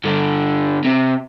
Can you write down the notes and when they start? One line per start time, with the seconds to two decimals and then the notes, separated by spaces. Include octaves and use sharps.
0.04 G2 D3
0.85 C3